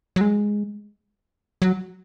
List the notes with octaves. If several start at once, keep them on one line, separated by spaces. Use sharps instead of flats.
F#3
G#3
F#3